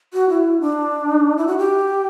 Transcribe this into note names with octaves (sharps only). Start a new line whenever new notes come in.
F#4
E4
D4
E4
F#4
G4